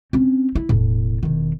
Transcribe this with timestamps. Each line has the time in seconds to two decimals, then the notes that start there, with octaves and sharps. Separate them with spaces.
0.13 C4 C#4
0.55 E4
0.69 E1 A2
1.23 E1 D#3